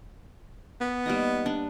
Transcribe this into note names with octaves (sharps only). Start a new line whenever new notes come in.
B3
G3 A#3 D#4
D4